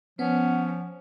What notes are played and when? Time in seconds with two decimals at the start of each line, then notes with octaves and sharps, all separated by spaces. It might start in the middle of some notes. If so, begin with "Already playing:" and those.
0.19 F3 B3 C#4 F#5